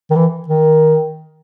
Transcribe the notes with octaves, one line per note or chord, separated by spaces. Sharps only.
D#3
E3
D#3